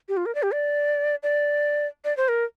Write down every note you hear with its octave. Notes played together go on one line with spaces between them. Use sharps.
G4
F4
A#4
D5
G4
D5
D5
D5
C5
A#4